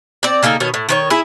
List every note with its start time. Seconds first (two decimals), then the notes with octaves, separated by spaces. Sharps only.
0.23 C4 D5
0.43 C#3 A#3 D#4 A4
0.60 B2 D#3 C#5
0.74 A2
0.89 D#3 B4 C#5
1.10 E4 G#4